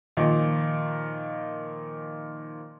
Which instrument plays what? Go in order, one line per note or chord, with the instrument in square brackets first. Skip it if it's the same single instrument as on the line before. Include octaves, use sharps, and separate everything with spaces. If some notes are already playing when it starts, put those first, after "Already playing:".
[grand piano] A#2 D#3 F3